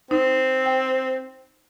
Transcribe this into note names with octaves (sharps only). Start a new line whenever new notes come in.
C4 D#4
G5